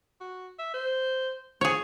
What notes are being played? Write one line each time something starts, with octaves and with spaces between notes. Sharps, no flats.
F#4
E5
C5
F3 G#4 C#5